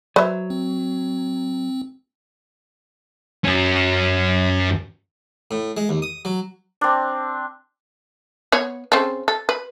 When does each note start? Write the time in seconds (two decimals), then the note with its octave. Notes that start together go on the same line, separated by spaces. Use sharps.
0.16 F#3 B4 C5 E5
0.50 C4
3.45 F#2 C#4
5.51 A2
5.77 G#3
5.89 D#2
6.02 D#6
6.25 F#3
6.81 C4 D4
8.52 B3 C#5
8.92 C#3 C4 A4
9.28 A4
9.49 B4